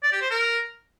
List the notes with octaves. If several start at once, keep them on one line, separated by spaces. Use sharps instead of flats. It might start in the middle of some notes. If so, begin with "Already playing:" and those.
D5
G4
C5
A#4